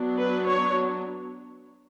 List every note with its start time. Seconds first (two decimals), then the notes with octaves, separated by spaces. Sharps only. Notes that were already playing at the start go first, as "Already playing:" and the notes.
Already playing: F#3 B3 D4
0.17 B4
0.46 C#5